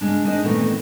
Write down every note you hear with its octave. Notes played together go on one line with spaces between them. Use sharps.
C#3 G#3 D4
G#3 D4 D#4 C5 D#5
A#2 D#3 E3 A3 B3 C4